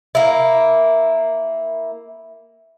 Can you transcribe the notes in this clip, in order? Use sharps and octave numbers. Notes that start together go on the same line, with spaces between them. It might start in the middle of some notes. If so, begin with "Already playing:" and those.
A#3 E4